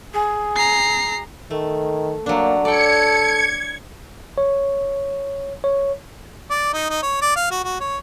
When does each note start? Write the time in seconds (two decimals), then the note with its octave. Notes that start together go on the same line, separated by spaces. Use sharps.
0.14 G#4
0.56 A#5 C7
1.51 D#3 A3
2.26 F#3 A#3 D4
2.65 A4 D5 G5 G#6 C#7
4.38 C#5
5.64 C#5
6.50 D5
6.73 D#4
6.90 D#4
7.03 C#5
7.22 D5
7.36 F5
7.51 F#4
7.64 F#4
7.80 C#5